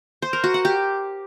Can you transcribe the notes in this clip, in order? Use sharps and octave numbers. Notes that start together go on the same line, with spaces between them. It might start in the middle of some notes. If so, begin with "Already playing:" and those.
C5
A#4
F#4
F#5
G4